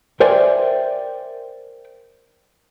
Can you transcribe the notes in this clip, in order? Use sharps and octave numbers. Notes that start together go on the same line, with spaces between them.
A#4 C5 D5 E5 G5 G#5